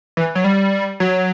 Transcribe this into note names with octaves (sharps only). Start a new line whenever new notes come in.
E3
F#3
G3
F#3